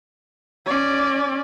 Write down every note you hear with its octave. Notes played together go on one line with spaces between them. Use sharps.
C#4 D5